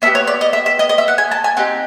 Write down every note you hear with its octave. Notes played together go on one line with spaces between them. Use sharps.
B3 D4 G4 E5
C#5
D5
D#5
E5
E5
D#5
D#5
E5
F#5
G#5
A5
G#5
C4 D#4 G4 F#5